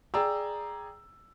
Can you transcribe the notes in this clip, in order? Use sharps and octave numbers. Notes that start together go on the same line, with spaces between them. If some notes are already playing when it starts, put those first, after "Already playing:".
G#4 D5 G5 A#5 E6